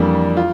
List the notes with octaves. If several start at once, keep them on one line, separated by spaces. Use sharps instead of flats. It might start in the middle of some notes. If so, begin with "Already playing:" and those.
Already playing: F2 E3 G3 A#3 D4
F4